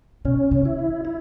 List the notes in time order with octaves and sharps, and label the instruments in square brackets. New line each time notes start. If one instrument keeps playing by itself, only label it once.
[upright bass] B2 [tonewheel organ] C#4
[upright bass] C#3
[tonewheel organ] E4
[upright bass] E3
[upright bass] F#3 [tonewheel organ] E4